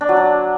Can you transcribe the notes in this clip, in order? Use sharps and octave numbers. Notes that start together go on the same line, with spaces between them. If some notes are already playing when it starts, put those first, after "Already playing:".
D4
F#3
D4